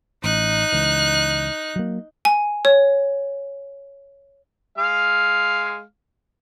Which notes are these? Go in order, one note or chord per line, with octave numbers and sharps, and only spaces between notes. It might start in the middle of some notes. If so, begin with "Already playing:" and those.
A1 D#4 F#6
C#2 E3
F#3 A#3
G#5
C#5
G#3 F5 F6